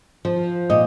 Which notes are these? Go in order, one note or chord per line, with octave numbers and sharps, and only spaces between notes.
F3
A#2 D#5